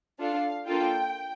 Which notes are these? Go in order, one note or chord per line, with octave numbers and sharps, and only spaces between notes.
D4 F4 A4 F5
A#3 D4 F4 A4 G5